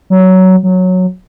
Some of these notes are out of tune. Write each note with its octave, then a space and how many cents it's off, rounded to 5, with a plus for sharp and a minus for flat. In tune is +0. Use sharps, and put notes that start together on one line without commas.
F#3 +15
F#3 -10